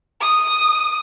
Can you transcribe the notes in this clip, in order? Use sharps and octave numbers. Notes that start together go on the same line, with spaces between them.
D#6